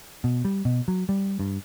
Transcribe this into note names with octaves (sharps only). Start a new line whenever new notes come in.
B2
G3
B2
F#3
G3
G2